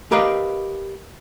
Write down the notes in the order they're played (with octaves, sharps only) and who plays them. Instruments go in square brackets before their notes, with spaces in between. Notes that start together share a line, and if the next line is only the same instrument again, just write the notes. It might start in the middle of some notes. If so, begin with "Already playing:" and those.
[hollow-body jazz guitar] G4 A#4 B4 D#5 F5